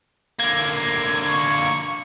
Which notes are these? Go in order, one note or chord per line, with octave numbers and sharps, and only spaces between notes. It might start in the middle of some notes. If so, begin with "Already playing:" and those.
D3 A#3 G#6
C#6